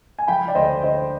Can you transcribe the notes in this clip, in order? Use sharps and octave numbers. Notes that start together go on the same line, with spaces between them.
G#5
F3 G5 B5
D5
D2 C5 D#5
D3 C5 D#5